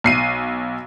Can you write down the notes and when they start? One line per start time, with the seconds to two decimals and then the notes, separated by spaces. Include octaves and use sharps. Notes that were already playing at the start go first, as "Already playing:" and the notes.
0.04 B1 C7 D#7